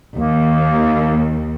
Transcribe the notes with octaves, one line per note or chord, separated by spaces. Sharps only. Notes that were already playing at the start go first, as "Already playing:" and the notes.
D#2 A#3